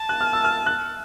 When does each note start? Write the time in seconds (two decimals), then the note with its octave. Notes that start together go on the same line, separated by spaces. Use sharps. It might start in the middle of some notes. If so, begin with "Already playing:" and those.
Already playing: A5
0.09 F#6
0.21 F6
0.33 E6
0.44 F6
0.66 F#6